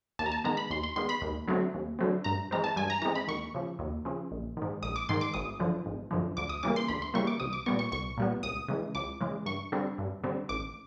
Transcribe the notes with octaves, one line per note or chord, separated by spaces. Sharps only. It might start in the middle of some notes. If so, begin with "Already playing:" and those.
D#2 A5
A#5
A5
D#3 G#3 B3 A#5
B5
D#2 C6
C6
D#3 G#3 B3 C6
B5
D#2
D3 F#3 A3 C4
D#2
D3 F#3 A3 C4
G2 A#5
E3 G#3 C4 A#5
A5
G2 G#5
A#5
E3 G#3 C4 A#5
B5
D#2 C#6
C#3 F3
D#2
C#3 F3
A#1
G#2 D#3
A#1 D#6
D6
G#2 D#3 C6
D6
G#1 D#6
F#2 D3 F3
G#1
F#2 D3 F3
D2 D6
D#6
C#3 E3 G3 A#3 D6
C6
D2 B5
C6
C#3 E3 G3 A#3 C#6
D6
C2 D#6
D6
A#2 G3 B3 C#6
C#6
C2 C#6
A#2 G3 B3
C#2 D#6
C#3 E3 G#3
C#2 D6
C#3 E3 G#3
G2 C#6
D3 G3 C4
G2
D3 G3 C4
A1 D6